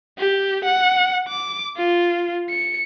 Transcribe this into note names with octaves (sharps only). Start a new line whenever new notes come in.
G4
F#5
D6
F4
C#7